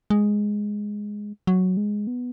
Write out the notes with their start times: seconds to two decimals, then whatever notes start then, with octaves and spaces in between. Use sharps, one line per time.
0.10 G#3
1.47 F#3
1.77 G#3
2.07 B3